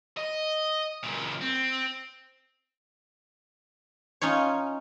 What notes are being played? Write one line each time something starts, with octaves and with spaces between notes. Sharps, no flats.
D#5
C#2 A#2
C4
C#4 D#4 F4 C#5